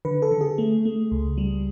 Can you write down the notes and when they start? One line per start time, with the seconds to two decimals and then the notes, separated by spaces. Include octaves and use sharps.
0.05 D3 B4
0.22 A4
0.31 D3
0.41 G#4
0.58 A3
0.85 A3
1.11 C#2
1.38 G3